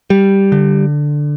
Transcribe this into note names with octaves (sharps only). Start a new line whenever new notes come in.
G3
D3